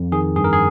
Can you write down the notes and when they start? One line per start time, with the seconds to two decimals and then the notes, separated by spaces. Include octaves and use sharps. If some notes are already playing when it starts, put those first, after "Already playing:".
Already playing: F2
0.12 D#3 G#4
0.36 G2 G#4
0.44 A#4
0.53 G#4